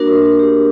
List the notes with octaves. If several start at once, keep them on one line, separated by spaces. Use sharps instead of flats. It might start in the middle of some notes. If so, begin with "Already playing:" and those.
Already playing: A#3 D4 F#4 A#4
G4